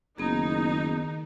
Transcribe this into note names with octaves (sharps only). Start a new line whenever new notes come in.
F#1 D#3 B3 D#4 G#4